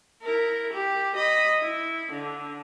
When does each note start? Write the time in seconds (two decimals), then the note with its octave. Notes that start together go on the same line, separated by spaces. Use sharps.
0.22 E4 A#4
0.73 G4
1.16 D#5 B5
1.62 E4
2.12 D3